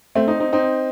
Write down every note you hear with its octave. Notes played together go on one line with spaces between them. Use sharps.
A3 C4
C4 D#4
C4 D#4
C4 D#4